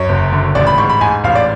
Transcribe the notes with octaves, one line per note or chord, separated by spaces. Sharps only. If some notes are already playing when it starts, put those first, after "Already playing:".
Already playing: F#2 C#5
F#1
D3
A1 D5
B5
G#2 C#6
B5
G#2 G#5
A1 F5
D5